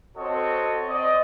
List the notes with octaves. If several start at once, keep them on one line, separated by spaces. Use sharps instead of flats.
C4 F#4 A4 C#5 D#5
C4 D5 D#5